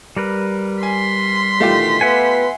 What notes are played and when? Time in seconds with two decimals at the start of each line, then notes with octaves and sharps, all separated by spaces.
0.16 G3 A#4 B4
0.83 G#5 C6 B6
1.60 B2 D#3 E3 A3 F4 G4
2.01 B3 B4 E5 F#5 G#5